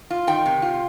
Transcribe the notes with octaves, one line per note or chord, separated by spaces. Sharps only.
F4
D#3 G5
C3
F4